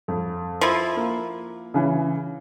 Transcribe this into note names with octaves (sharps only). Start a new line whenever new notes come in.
F2
F3 E4
A#3
C#3 E3